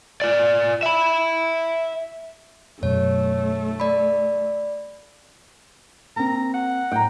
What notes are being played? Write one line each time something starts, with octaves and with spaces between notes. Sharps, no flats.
F4 D5
E5 B5
F#2 B2 F#3 A3 C#5
D5 B5
A#3 C4 A#5
F#5
A2 G5 A#5